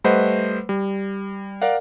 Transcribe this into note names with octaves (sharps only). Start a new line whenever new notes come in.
G3 A3 B4 C5 D#5 F#5
G3
A#4 D5 F5 F#5